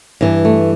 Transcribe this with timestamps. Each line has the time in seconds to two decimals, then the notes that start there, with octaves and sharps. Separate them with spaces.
0.21 G2 E3
0.45 A3